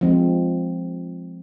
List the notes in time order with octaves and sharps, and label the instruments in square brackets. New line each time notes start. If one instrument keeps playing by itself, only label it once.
[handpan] F3 G#3 C4